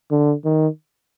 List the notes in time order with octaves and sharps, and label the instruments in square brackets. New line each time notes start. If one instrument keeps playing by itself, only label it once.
[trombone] D3
D#3